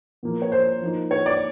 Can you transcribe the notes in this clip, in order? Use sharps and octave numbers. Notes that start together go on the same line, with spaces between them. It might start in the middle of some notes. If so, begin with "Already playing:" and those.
A#2 F3 A#3
C#5
C5
F3 A#3 D#4
C#5
D5